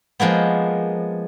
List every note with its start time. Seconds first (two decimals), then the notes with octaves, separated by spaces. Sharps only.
0.20 F3 G#3 A#3 B3